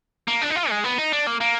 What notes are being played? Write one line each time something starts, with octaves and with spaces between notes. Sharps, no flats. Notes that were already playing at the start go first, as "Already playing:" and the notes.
A#3
D4
D#4
F4
G#3
B3
D#4
D4
A#3
A#3